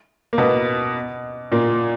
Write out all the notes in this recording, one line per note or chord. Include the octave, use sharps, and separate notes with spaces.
A#3
B2 B3
A#2 A#3